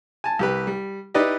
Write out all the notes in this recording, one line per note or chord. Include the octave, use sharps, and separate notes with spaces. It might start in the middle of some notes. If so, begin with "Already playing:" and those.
G#5 A5
C2 G4 B4
G3
D#4 E4 G4 B4 D5 D#5